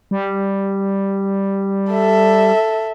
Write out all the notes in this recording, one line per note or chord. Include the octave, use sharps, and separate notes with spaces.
G3
A4 E5